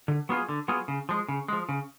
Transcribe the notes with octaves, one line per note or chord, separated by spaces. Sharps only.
D3
F#3 B3 F4 G#4
D3
F#3 B3 F4 G#4
C#3
F3 G#3
C#3
F3 G#3
C#3